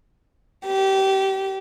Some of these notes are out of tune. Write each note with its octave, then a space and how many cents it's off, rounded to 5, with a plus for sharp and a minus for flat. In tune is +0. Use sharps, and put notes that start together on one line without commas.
G4 -25